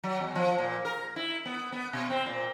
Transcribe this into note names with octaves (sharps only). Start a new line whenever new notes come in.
F#3
E2
F3
A#2
A#4
E4
B3
B3
B2
C4
A#2